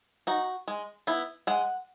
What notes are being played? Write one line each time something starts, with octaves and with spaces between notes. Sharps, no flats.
D#4 F#4
G#3
B3 E4
G#3 F#5